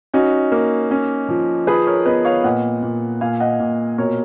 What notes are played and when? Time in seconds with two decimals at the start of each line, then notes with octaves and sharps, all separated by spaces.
0.14 C#4 D#4 F#4
0.52 A#3
0.91 C#4
1.29 F3
1.67 F3 G#4 B4
1.87 A#4 C#5
2.06 B3 B4 D#5
2.25 C#5 F5
2.44 A#2 D#5 F#5
2.83 A#2
3.21 A#2 F5 G#5
3.40 D#5 F#5
3.59 A#2
3.98 B2 A#4 C#5